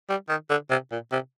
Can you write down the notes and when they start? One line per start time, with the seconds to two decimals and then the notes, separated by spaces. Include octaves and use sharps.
0.09 G3
0.29 D#3
0.50 D3
0.70 C3
0.91 A#2
1.12 C3